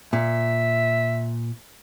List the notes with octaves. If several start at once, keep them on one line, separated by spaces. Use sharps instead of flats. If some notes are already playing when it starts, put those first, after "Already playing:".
A#2 E5